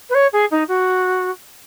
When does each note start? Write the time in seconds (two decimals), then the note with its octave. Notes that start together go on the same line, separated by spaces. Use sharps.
0.10 B4
0.15 C#5
0.33 G#4
0.51 D#4
0.68 F#4